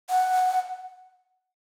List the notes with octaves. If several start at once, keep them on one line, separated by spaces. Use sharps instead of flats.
F#5